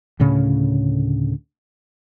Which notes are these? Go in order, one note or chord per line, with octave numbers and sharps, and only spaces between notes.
D2 A2 C#3 C#4